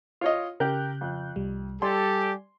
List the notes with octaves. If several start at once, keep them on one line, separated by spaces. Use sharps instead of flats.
F4 C#5 D#5
C#3 G4 A#4 F#6 G6
F2
C2 G3
G3 G4 A4 D5 G#5 C6